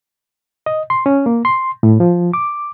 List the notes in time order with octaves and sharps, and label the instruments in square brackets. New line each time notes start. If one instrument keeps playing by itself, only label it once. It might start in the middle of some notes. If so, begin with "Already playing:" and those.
[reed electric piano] D#5
C6
C#4
A#3
C6
A2
F3
D6